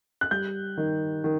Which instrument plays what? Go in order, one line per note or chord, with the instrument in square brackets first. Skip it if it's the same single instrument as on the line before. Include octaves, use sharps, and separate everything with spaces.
[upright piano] F#6
G3 G6
D#3
D#3